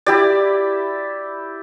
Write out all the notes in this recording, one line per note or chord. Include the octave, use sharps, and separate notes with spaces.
E4 G4 D5